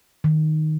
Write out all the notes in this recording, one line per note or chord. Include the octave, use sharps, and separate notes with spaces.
D#3